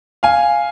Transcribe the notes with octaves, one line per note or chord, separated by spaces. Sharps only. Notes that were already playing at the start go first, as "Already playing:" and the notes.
F5 G#5